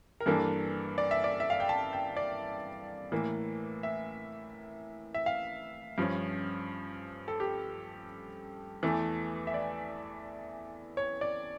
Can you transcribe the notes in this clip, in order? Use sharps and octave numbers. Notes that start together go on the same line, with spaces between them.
A#4
G2 E3 A#3 D4 A4
D5
E5
D5
E5
F5
G5
A5
G5
D5
A2 E3 A#3
E5
E5
F5
G2 F3 C#4
A4
G4
E2 E3 A3
E5
D5
C#5
D5